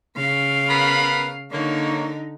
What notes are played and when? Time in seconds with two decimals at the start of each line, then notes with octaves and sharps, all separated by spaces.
0.15 C#3 F5
0.68 B3 A#4 B5
1.52 D3 A#3 D#4 C#5